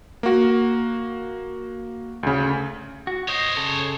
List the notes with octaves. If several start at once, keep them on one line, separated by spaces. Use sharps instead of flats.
A#3 F#4
D2 C#3
F#4
C5 C#5 D#5
C#3 A4